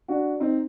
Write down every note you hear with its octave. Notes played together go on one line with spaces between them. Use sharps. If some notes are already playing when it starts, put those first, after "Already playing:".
D4 F#4
C4 D#4